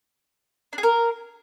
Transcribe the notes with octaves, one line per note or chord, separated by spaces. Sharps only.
D4
G#4
A#4